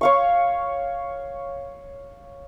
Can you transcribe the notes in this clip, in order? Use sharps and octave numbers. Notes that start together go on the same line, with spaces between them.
C#5 F5 C#6